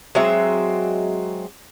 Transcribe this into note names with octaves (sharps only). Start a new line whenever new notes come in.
F#3 G#3 C4 E5